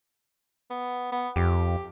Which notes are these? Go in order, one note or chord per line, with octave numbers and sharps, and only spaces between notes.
B3
B3
F2 G4